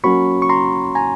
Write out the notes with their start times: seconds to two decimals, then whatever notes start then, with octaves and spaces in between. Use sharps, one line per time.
0.03 F#3 A#3 C#4 F#4 B5 C#6
0.42 C#6
0.49 A#5 C6
0.95 G#5 A#5